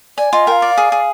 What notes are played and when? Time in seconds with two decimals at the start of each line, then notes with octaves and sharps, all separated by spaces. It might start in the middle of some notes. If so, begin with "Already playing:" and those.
0.18 D5 G#5
0.33 F4 D#5
0.47 A#4 G5
0.52 F5
0.62 D5
0.77 G#4
0.92 G#4